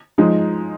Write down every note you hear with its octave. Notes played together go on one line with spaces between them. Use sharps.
F3 G#3 D#4